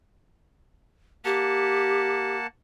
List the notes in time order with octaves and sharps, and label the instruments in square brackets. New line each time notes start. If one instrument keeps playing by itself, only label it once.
[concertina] A#3 F#5 A5 [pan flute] G4